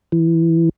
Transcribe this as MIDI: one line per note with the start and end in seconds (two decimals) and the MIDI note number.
0.12 0.69 52